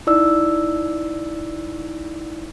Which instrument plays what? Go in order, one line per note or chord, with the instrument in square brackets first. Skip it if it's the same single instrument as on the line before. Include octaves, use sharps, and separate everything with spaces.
[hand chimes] D#4 E4 D5 E6